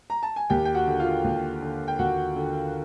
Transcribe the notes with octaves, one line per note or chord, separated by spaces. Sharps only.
A#5
A5
G#5
D#2 G4 G5
G5
F#4 F#5
D3
F4 F5
D#2
D3
G5
D#2 F#4 F#5
D3